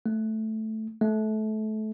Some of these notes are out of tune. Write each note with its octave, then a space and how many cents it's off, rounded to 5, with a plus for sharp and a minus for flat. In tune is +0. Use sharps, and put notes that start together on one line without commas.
A3 -5
A3 -25